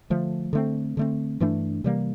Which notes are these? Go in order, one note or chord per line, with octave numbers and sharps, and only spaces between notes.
D3 F3 A3
D3 A3 C4
D3 A3 C4
G2 E3 A3 D4
C3 E3 G3 A#3